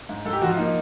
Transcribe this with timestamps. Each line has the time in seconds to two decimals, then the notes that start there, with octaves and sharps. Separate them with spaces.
0.09 G#2
0.25 G#2 A4
0.33 G4
0.42 F3 F#4
0.49 F4
0.57 A#3 D#4